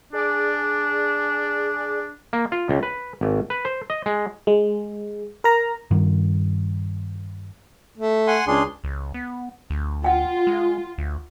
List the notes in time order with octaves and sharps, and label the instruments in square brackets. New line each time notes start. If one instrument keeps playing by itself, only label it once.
[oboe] D4 [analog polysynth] G#4 D5
[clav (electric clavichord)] A#3
F4
C#2
B4
G#1
B4
C5
D#5
G#3
[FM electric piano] G#3
A#4 A#5
[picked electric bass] G2 D#3
[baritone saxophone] A3
[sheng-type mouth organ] F#5 G#5 C6
[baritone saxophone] C#2 [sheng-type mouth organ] D4 G#4 C6
[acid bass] C#2
B3
D2
[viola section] F4 [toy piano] F#5 G5
[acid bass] G#3
D2